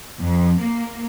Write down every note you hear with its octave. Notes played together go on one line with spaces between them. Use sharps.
F2
A#3